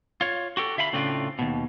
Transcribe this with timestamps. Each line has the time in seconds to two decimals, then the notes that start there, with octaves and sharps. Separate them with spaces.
0.21 F4 C#5
0.57 F#4 G4 A4
0.77 D3 E5 F5 G5 B5
0.93 A2 C#3 A3 C4 D4 F4
1.39 D#2 B2